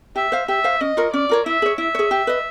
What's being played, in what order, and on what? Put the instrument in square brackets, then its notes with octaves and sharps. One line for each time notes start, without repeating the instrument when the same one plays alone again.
[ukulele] G4 [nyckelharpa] E5
[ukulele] C5 F5
[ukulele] G4 [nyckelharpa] E5
[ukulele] C5 F5
[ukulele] C#4 [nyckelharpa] D#5
[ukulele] F4 A#4 C#5
[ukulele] C#4 [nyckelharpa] D5
[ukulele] F4 A#4 C#5
[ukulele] E4 [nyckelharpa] E5
[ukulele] G#4 C#5
[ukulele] E4 [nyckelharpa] E5
[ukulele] G#4 C#5
G4
B4 D#5